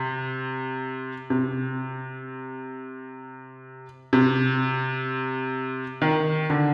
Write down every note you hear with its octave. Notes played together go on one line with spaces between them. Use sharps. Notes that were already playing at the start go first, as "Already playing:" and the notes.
Already playing: C3
C3
C3
D#3
D3